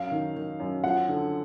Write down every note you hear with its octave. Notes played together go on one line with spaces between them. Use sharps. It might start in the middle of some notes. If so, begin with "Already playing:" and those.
Already playing: F#2 F5
D#3
D#3
F#2
F3 F#5
D3